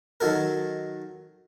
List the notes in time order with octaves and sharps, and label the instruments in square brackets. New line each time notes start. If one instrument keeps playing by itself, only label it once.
[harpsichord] D#3 F#3 A4 A#4